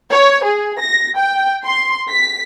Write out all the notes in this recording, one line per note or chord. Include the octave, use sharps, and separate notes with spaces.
C#5
G#4
A#6
G5
C6
B6